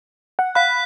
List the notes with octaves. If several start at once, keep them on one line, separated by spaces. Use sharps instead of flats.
F#5
F5 B5 F#6 B6